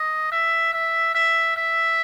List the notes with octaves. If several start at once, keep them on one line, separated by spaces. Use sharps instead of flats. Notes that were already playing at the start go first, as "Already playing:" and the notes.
Already playing: D#5
E5
E5
E5
E5